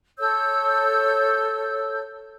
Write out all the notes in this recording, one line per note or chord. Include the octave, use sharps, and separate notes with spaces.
A4 C#5 E6 G6